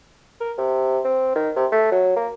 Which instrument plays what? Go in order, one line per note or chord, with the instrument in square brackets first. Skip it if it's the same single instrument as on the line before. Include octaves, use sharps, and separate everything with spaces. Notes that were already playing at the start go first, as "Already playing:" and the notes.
[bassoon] A#4
C3
C4
D#3
C3
A3
F#3
A#3